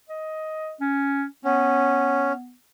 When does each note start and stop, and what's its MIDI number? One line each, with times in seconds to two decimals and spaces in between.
0.09 0.74 75
0.80 1.25 61
1.45 2.54 59
1.45 2.33 61